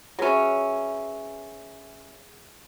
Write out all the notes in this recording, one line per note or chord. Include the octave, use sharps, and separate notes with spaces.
F#3 C#4 G#4 B4 E5